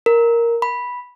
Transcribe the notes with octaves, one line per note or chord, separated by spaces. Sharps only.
A#4
B5